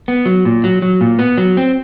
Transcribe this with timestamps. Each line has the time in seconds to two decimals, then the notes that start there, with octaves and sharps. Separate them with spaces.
0.08 B3
0.26 F#3
0.45 A#2
0.64 F#3
0.82 F#3
1.01 A#2
1.19 B3
1.37 F#3
1.57 C4